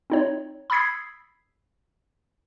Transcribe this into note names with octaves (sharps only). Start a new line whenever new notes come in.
C4 D#4 C#5
B5 D#6 E6 G#6 B6 C7